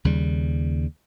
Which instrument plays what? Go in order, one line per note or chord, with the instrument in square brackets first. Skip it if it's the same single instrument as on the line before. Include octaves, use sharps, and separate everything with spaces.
[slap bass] D#2 C#3 G3